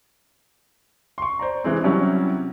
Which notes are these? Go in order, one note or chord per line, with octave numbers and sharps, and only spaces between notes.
C6 C#6
C5 D5 A#5
C3 E3 G#3 C4
C3 F#3 G3 C#4 E4